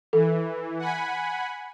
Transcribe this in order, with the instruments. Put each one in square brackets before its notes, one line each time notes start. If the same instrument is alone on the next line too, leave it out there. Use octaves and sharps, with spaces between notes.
[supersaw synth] E3 [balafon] A4
[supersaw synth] F#5 G#5 B5